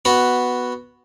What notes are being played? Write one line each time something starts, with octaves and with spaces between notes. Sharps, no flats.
B3 F#4 B5